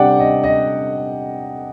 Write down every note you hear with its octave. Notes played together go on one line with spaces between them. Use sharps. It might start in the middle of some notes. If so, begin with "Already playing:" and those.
Already playing: C3 G3 D4 D5 F#5 G5
D#5
D#5